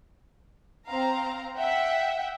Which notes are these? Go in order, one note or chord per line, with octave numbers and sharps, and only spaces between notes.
C4 F5 A#5
E5 F#5 G5